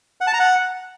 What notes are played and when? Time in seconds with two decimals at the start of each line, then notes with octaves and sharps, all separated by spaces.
0.21 F#5
0.27 A5
0.33 A#5
0.40 F#5